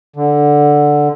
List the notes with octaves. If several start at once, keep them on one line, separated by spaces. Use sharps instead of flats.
D3